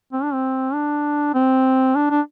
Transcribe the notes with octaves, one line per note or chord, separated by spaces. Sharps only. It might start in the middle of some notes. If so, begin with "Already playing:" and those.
C4
D4
C4
D4
C4
D4
D4